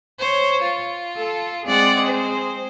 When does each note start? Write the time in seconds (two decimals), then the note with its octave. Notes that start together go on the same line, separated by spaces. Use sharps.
0.19 C5 C#5
0.62 F4
1.18 A4
1.66 G#3 C4 G#4 D5 F#5
2.07 C5